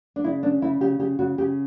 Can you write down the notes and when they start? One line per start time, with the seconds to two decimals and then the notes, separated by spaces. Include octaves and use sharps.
0.16 D4
0.24 C#3 E4
0.43 C#4 D4
0.62 C#3 E4
0.81 C#3 G4
0.99 C#3 G4
1.19 C#3 F#4
1.38 C#3 G4